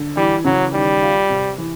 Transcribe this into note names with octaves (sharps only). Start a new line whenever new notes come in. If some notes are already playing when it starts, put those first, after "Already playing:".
Already playing: D3
E3 G3
C#3 F#3
D#3 G3
F4
C3
E3